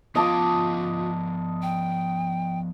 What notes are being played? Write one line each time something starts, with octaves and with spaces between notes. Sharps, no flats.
F3 B3 F4 D#5 F5 A5 D6
G5